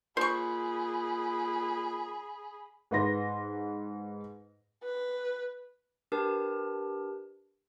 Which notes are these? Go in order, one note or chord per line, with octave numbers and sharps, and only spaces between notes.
A#2 G#4 C5 B5 C#6
G#2 B4 C6 A#6
B4
D4 G4 A#4 B4 A5